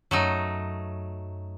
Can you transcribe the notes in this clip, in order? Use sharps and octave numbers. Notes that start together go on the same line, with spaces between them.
F#2 F#3 A3 D#4